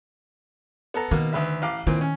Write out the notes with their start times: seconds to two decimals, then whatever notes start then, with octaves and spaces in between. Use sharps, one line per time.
0.94 B3 A4 A#5
1.11 B2 D#3 A#3
1.33 D2 B4 E5
1.62 A1 F5 D6
1.87 A#2 D#3 E3 C4
2.01 C#4